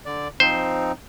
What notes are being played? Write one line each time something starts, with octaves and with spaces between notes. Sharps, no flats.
D3 D5
F3 C4 D#4 C5